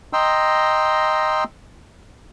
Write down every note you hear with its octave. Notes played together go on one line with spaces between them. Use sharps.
D#5 G5 A#5 C6 E6